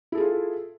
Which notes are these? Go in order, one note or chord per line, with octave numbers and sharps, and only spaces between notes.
E4 F4 G#4 A4